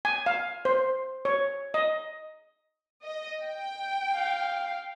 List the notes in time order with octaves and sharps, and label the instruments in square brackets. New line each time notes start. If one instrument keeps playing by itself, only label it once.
[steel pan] G#5
F5
C5
C#5
D#5
[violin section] D#5
G5
[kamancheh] F5